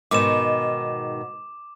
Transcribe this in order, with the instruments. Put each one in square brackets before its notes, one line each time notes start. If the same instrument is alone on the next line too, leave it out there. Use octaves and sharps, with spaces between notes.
[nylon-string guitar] G#2 B2 D#3 [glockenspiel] D6 E7